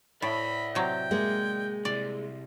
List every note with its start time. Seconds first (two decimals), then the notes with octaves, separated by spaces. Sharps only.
0.22 A2 D5 E5 B5
0.75 C3 F#3 G5
1.11 G#3 A#3 G#4
1.85 C2 C3 D5